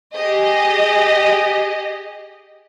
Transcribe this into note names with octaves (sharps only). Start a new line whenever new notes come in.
G4 G#4 D#5